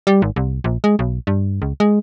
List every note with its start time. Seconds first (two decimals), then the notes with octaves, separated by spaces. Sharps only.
0.07 G3
0.22 G#1
0.36 C2
0.64 A#1
0.84 G#3
0.99 B1
1.27 G2
1.62 C#2
1.80 G#3